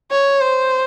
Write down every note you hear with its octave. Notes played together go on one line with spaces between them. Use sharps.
C#5
C5